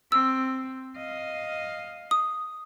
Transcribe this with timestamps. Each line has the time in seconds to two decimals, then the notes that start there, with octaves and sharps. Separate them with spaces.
0.12 C4 E6
0.97 D#5 F5
2.11 D#6